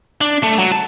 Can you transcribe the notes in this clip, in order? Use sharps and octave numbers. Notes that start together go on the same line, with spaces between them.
D4
A3
F#3
A5